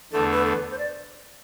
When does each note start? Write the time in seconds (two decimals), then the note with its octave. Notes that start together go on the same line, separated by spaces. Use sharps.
0.12 E2 D3 A3 A4
0.32 B4
0.46 A4
0.51 B4
0.71 C5
0.78 D5